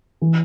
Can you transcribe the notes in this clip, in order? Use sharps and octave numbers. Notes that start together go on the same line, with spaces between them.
E3